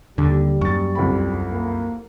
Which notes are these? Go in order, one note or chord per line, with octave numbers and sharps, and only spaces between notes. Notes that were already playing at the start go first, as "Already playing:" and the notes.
D#2 D3 G3
F#2 C#6 A6
C2 F2 B5
A#3